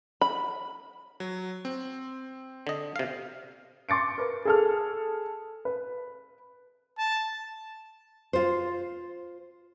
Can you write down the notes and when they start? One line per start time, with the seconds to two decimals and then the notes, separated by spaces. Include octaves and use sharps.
0.21 B5
1.20 F#3
1.65 C4
2.67 D3 D#5
2.96 C3 F5
3.89 C6 D6 A6 C#7 D7
4.18 A#4 B4
4.45 G#4 A4 F6
5.65 B4
6.98 A5
8.33 F4 C5